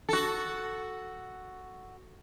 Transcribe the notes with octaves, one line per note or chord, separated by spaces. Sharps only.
F#4 A4